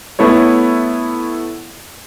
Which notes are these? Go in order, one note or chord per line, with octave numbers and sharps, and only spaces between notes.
A3 B3 E4 A4 C#5